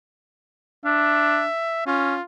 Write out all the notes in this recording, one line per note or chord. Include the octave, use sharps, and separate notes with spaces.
D4 E5
C#4 F4